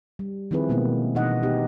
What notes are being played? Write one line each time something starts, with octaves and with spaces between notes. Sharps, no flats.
G3
D#3 F3 C4 E4 G#4 B4
B2 G#3 A#3 B3
B2 E3 D4 D#4 D#5 F#5
B3 D#4 G4